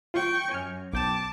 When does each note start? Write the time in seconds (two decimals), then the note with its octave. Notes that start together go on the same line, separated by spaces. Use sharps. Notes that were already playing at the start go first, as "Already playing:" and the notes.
0.14 F4 G5 C#6 G6
0.51 F#2 G#5 F6
0.93 B1 G5 A5 D6 E7